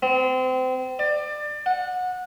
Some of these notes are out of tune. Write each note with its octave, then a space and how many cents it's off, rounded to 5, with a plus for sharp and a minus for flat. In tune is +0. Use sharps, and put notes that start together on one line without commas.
C4 -30
D5 +25
F#5 -20